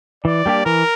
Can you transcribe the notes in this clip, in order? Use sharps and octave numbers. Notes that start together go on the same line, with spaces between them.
E3 D5
G3 A#3 D4 G4
E3 A#4